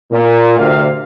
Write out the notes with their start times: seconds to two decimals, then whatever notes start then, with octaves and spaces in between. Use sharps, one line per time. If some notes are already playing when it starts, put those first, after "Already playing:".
0.12 A#2
0.59 D2 C3 F5